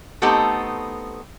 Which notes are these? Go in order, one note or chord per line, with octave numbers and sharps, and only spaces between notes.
A3 B3 C4 D#4 G4 A4